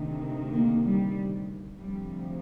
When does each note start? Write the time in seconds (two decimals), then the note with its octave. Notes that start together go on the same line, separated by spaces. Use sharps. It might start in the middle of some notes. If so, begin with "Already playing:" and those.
Already playing: D2 C3 D#3
0.53 A#3
0.84 G3
1.79 D2 C3 F3 G3